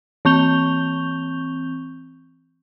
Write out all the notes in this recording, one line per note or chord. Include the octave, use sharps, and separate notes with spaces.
E3 C4 C#6 G6 F7 G7